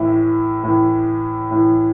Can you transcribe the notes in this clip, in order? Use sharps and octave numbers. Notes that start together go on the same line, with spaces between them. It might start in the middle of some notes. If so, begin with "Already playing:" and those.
Already playing: A2 E3 E5
A2 E3
A2 E3